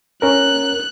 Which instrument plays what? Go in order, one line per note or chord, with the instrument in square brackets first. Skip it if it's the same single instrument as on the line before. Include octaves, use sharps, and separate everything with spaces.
[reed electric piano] C#4 A#4 [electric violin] F#6